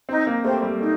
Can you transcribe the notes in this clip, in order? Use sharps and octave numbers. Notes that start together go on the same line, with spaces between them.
C4 D#4
A#3
A3 G4 C5
G3
A3 D#4